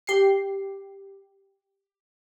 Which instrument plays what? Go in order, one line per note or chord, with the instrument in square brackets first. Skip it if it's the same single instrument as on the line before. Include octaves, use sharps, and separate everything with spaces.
[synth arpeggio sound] G4 C7